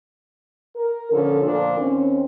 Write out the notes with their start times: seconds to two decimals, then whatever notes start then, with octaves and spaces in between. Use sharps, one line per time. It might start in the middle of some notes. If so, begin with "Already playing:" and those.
0.76 A#4
1.12 A#2 D3 F3 C#4 A4
1.42 D2 A#2 F3 A#3 D4
1.79 D#2 C4 C#4